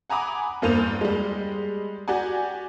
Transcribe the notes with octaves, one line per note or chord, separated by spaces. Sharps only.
F#5 G#5 A#5 B5 D6 D#6
E2 G2 A#3 C5 D#7 F7
G3 G#3
F#4 G4 D5 F#5 G#5